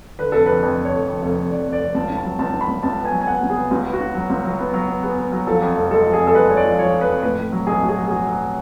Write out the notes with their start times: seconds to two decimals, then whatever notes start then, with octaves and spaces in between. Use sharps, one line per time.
0.19 D3 B4
0.32 F1 A4
0.46 F2 B4
0.63 F2 B4
0.78 F1
0.85 C#5
0.93 F1
1.07 F2
1.22 F1
1.36 F1
1.51 F2 D5
1.66 F1
1.73 D5
1.80 F1
1.95 C#2 A5
2.09 C#3
2.17 A5
2.25 F#3
2.39 C#2 A5
2.54 C#3
2.61 B5
2.69 C#2
2.83 C#2 A5
2.98 B3
3.05 G#5
3.12 F#3
3.21 G#5
3.27 B3 F#5
3.42 C#2
3.50 G#4
3.57 B3
3.71 C#2 F#4
3.86 B3
3.93 F#4
4.00 C#3
4.15 F#3
4.30 C#2
4.45 F#3
4.59 B3
4.74 F#3
4.88 B3
5.03 B3 G#4
5.18 B3
5.32 F#3
5.47 F3 A4
5.62 F2
5.76 F1
5.91 G#3 A4
6.05 F3
6.13 G#4
6.21 F2
6.27 A4
6.35 G#3 B4
6.50 G#3 C#5
6.57 D5
6.64 F3
6.79 F3 C#5
6.94 F2
7.01 B4
7.08 F2
7.23 A2 B4
7.38 A2
7.52 F#3
7.67 B1 G#4
7.81 A2 F#4
7.89 G#4
7.96 F#3
8.07 G#4
8.11 B1 F#4
8.26 F#3